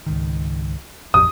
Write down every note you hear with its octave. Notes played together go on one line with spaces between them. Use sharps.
C#2 G#2 D#3
A1 F2 D#6